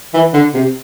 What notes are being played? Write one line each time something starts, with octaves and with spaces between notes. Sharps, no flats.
E3
D3
C3